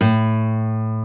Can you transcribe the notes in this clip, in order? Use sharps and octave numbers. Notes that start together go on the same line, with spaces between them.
A2